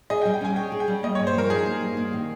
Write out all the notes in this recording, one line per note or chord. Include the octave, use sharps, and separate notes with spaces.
G#4 D#5
G5
G3
G5
C#4 G#5
C#5 G5
G#4
G5
G3
A#3 D#5
C#5
G2
C5
F3 A#4
D#4 G#4
A#3
G2
A#3
D#3